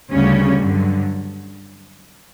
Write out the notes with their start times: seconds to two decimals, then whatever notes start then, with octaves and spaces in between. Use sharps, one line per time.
0.12 D2 C#3 G3 C#4
0.61 G2 D3 F#3